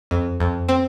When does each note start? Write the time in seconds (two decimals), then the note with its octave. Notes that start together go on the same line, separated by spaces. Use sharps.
0.11 F2
0.40 F2
0.69 C4